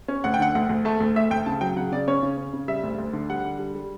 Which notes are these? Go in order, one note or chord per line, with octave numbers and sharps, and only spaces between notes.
C#4
D2 F#5
G5
D3 F#5
D2 F#5
D2
A3 A5
D2
A3 E5
D2 G5
C#3 A5
F#3 G5
C#3 F#5
C#3 D5
C#4 C#5
C#3
C#4
C#3
G3 E5
D2
D2
D3
G3 F#5
D3
G3
G3